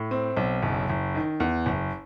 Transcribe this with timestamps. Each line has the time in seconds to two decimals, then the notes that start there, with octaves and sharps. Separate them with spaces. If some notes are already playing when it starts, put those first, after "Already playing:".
Already playing: A2
0.11 C4
0.37 B1
0.63 F#1
0.90 F#1
1.15 D#3
1.40 E2
1.66 F#1